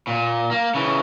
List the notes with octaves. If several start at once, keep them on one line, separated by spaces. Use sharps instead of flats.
A#2
A#3
C#3 E3